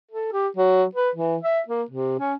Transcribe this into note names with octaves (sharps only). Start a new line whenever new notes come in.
A4
G4
F#3
B4
E3
E5
A#3
C3
C#4